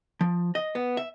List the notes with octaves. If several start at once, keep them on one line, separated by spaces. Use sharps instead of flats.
F3
D#5
B3
E5